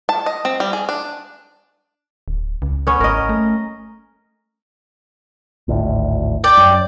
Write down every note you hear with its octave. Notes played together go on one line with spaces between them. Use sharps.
A5
D#5
C4
G3
G#4
D4
D1
C#2
B3 C#4
G#1 A#4 D#5
A3
G#1 D2 A2
D5 G5
F#2